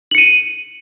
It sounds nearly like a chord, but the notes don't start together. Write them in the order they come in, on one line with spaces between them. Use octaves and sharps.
F#7 C#7 D#7